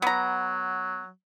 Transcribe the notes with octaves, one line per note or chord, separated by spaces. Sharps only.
F#3 B3 A#5